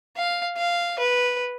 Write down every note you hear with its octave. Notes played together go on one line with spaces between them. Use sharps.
F5
F5
B4